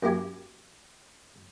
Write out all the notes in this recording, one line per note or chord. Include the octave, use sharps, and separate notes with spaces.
F#2 A#3 E4 G4 G#5